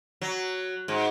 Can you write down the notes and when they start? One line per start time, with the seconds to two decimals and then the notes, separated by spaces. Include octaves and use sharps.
0.22 F#3
0.88 G#2